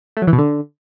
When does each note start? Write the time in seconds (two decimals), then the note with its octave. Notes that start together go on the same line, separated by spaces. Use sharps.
0.17 A3
0.22 F#3
0.27 E3
0.33 B2
0.38 D3